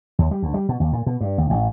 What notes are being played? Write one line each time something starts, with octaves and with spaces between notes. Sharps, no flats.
D#2
G3
D2
G3
B2
D#2
A#2
B2
G2
D#2
A1